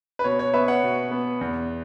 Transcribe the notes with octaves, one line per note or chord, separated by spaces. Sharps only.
B4
B2 C#5
C#5
B3 B4 E5
C#5 F#5
B2
B3
E2